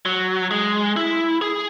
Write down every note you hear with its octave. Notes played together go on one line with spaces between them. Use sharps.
F#3
G#3
E4
G#4